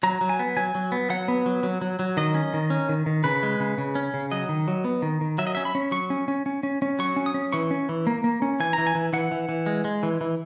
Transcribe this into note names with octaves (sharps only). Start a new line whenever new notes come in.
F#3 A#5
F#3
G#5
B3
F#3 G#5
F#3
B3
F#3 F#5
B3
F#3
F#3
F#3
F#3
D#3 D#5
C#4
D#3
C#4
D#3
D#3
C#3 B4
G#3
C#3
C#3
C#4
C#3
F#3 D#5
D#3
F#3
B3
D#3
D#3
F#3 E5
D#5
C#4 E5
B5
C#4
F#3 C#6
C#4
C#4
C#4
C#4
C#4
F#3 C#6
C#4
D#6
C#4
E3 C#6
C#4
E3
A#3
A#3
C#4
E3 G#5
E3 A#5
G#5
E3
E3 F#5
E3
E3
G#3
G#3
E3
E3